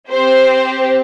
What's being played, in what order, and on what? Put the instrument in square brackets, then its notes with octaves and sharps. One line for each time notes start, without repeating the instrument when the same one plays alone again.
[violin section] C4 G4 C5